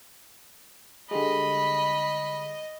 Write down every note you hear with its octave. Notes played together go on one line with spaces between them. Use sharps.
D3 G3 G#3 D#5 B5